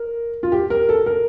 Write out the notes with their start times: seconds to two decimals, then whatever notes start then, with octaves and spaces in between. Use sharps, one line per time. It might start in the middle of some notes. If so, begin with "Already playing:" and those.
Already playing: A#4
0.43 F4
0.52 G4
0.70 A#4
0.89 A4
1.06 A#4